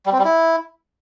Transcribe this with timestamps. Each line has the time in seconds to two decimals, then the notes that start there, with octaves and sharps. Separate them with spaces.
0.06 G3
0.12 C4
0.19 G3
0.25 E4